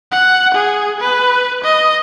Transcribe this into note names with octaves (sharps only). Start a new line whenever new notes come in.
F#5
G#4
B4
D#5